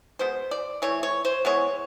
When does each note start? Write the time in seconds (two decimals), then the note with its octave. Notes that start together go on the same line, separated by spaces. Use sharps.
0.19 B2 G#3 B3 C5
0.51 D5
0.82 E3 A3 C#5
1.03 C#5
1.25 C5
1.45 E3 G#3 B3 C#5